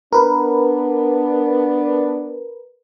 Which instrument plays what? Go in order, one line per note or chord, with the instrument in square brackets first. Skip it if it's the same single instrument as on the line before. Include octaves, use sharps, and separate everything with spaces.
[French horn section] B3 D4 [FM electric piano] A#4 B4